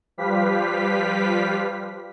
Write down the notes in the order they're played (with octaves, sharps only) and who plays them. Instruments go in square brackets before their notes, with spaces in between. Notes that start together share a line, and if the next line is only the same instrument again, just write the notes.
[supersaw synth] F3 G3 G4 B4 F5 B6